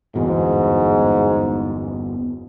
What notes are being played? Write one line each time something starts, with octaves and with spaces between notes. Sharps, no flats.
G1 E2 G#2 B2